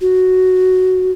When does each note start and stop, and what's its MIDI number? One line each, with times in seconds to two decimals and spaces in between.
0.01 1.12 66